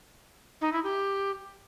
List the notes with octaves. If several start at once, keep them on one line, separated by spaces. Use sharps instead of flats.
D#4
E4
G4